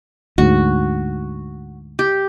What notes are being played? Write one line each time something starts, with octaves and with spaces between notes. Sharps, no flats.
D2 G#2 F#4
G4